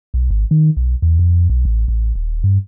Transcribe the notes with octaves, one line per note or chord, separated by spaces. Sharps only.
B1
G#1
D#3
B1
E2
F2
B1
A1
A1
D#1
G2